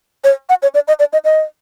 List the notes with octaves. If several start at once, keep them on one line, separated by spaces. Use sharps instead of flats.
C#5
F#5
C#5
D5
D#5
D5
D#5
D#5